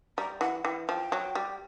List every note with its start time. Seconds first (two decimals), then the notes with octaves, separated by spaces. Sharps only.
0.18 G3 A#5
0.41 E3 F#5
0.64 E3 G5
0.88 F3 G5
1.12 F#3
1.35 G3